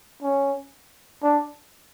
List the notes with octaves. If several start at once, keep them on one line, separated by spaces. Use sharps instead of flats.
C#4
D4